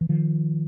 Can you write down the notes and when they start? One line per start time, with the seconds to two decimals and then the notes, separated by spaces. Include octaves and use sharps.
0.01 E3
0.09 D#3 F3